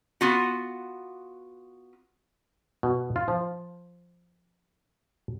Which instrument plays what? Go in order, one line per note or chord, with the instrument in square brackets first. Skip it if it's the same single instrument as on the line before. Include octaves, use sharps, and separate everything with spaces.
[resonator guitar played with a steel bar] B3 F4 F#4
[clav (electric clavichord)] B2
F4
F3